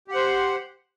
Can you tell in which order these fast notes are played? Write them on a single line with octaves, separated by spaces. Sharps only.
G4 F#5 C5